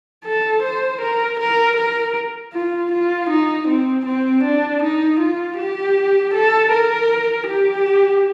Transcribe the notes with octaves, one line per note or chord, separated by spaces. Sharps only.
A4
C5
A#4
A#4
A#4
F4
F4
D#4
C4
C4
D4
D#4
F4
G4
A4
A#4
G4